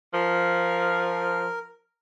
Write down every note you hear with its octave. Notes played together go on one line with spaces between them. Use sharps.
F3 A#4